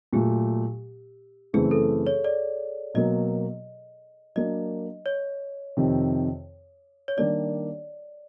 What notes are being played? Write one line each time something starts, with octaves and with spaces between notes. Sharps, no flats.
A#2 F#3 A3 G4
F#2 C#3 E3 A3 C4 G#4
A4
C#5
D5
B2 F#3 A#3 D#5
F#3 A#3 D4 D#5
C#5
F2 C3 D#3
C#5
D#3 G3 A#3 D4 G4 D5